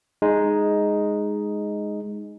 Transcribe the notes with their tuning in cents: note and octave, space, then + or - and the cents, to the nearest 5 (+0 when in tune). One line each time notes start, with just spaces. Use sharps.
G#3 +0 D#4 +0